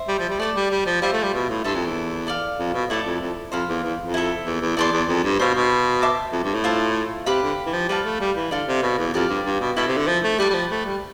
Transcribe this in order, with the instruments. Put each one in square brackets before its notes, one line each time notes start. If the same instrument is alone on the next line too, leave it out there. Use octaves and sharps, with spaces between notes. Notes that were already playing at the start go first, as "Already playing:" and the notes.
Already playing: [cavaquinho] C5 E5
[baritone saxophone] G3
F3
G3
[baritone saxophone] A3 [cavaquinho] D5 A5 D6
[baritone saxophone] G3
G3
F3
[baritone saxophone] G3 [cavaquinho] F4 C5 E5
[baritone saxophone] A3
G3
B2
A2
[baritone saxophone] G2 [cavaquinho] A4 E5 A5 C6
[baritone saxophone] F2
E2
[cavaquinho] A4 D5 F5
[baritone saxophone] F2
B2
[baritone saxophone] A2 [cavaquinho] E4 A4 D5 A5
[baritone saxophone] F2
F2
[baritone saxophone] F2 [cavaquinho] C5 F5 B5
[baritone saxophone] E2
E2
F2
[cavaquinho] E4 A4 E5
[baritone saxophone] E2
E2
[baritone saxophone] E2 [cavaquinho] D5 A5 C6
[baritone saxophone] E2
F2
G2
[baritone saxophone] B2 [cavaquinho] C5 F5 C6
[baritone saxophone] B2
[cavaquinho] C5 E5 A5 D6
[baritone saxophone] F2
G2
A2
[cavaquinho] F4 C5 E5 A5
[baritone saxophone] C3 [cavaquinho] G4 B4 F5 B5
[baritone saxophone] D3
E3
F3
[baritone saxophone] G3 [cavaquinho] B4 F5 A5
[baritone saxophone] A3
G3
E3
[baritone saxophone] D3 [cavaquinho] A4 D5 F5
[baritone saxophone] C3
B2
E2
[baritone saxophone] F2 [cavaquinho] G4 D5 F5
[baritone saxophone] G2
G2
B2
[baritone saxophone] B2 [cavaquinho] E4 A4 E5 B5
[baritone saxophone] C3
D3
F3
A3
[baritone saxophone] G3 [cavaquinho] G4 B4 E5 A5
[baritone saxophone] G3
F3
A3
G3